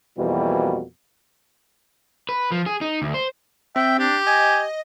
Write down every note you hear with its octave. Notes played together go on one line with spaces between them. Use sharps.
F2 B2 E3 G3 A#3 F#4
B4
F3
G#4
D#4
D2
C5
C4 E5 G5
D4 G4
D#5 G#5